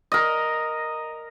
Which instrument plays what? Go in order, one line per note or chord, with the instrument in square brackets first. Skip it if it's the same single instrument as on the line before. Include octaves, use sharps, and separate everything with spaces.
[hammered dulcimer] A#4 D#5